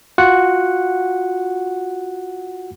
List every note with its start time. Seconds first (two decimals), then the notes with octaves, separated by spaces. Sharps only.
0.18 F4 F#4 F#5